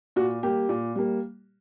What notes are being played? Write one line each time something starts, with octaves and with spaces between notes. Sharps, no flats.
A#2 F#4
G3 A#3 G4
A#2
G3 A#3